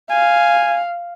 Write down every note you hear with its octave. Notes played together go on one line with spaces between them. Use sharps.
F5 G#5